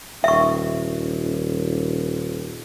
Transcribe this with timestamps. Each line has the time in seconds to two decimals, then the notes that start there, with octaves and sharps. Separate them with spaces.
0.24 D#1 E5 C#6